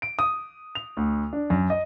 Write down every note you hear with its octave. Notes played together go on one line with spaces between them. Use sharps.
D7
D#6
F7
D2
D4
F#2
D#5